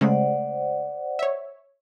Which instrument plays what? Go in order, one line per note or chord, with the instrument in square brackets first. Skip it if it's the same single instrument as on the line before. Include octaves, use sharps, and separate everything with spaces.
[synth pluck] C#3 G#3 A3 [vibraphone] C5 D5 F#5
[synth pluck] C#5 E5